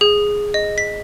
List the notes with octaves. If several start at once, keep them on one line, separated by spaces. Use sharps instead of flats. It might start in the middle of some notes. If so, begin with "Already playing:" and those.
G#4
D#5
B6